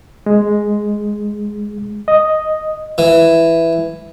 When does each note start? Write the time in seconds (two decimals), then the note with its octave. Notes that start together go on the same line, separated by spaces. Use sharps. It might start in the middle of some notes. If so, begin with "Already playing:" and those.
0.26 G#3
2.08 D#5
2.98 E3